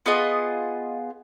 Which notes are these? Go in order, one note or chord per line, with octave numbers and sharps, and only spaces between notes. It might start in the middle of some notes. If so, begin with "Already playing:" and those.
B3 F4 G#4 D#5